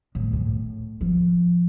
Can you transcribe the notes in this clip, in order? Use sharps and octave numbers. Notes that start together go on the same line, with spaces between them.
A2
A#2
A2
F3